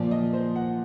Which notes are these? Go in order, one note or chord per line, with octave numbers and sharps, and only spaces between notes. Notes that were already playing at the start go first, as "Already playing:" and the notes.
Already playing: A#2 F3 D5
D#5
C5
F#5